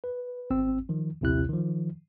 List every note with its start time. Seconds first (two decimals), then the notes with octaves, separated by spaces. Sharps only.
0.04 B4
0.50 G#1 C4 E6
0.89 D#3 F3
1.21 A#1 D#2 C3 E4 F#6
1.49 D#3 F3